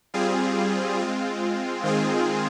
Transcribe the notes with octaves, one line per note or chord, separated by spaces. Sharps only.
G3 C4 F4 G#4
G#3 C4 F4
D#3 G#3 C4 F4 G#4